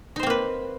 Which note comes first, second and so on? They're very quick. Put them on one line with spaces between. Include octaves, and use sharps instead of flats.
D#4 C5 C4 A#3 B4